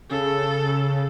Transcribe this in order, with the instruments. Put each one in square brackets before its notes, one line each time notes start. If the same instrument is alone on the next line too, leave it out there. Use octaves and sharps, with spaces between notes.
[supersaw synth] C#3 [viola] A4